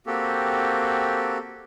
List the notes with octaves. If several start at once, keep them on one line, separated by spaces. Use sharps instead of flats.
A#3 C4 F#4 G4 A4